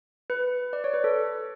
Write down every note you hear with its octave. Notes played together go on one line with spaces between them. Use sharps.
B4
D5
C#5
B4
A4